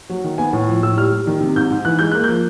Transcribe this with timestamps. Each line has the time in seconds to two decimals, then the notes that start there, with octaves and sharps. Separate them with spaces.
0.10 F#3
0.24 D#3
0.38 B3 G#5
0.53 A2
0.68 F3
0.83 A2 E6
0.97 G3 F6
1.12 G3
1.27 D#3
1.41 C3
1.56 G#2 G6
1.70 G#2
1.85 E3 F#6
1.99 G#3 G6
2.11 A#3 F#6
2.24 F3 G6